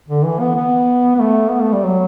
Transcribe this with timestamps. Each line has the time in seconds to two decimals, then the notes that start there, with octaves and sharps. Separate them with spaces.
0.08 D3
0.24 E3
0.40 B3
0.56 B3
1.15 B3
1.20 A3
1.49 B3
1.60 A3
1.72 G3
1.85 F#3